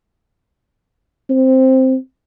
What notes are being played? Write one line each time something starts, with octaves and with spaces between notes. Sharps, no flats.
C4